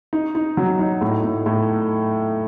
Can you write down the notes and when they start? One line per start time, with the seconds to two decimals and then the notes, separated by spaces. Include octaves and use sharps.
0.13 D#4
0.35 D#4
0.57 F#3
0.79 D#4
1.01 A2
1.24 A2
1.46 A2